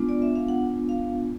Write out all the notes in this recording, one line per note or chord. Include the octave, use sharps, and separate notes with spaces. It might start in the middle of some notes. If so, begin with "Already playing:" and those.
Already playing: G#3 B3 D4 F4
D5
E5
F5
F#5
F5